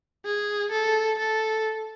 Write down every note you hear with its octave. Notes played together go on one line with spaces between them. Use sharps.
G#4
A4
A4